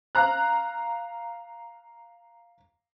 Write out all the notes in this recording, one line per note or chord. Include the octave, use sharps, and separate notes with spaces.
F5 A#5 F#6